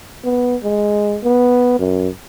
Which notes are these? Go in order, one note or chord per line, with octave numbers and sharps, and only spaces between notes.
B3
G#3
B3
F#2